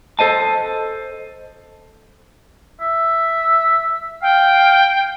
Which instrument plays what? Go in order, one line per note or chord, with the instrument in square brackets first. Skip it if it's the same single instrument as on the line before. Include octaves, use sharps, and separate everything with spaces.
[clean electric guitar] A4 C5 D#5 A5
[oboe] E5
[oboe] F5 [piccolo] G5